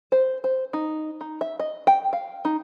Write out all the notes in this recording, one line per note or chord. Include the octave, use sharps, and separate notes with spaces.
C5
C5
D#4
D#4
E5
D#5
G5
F5
D#4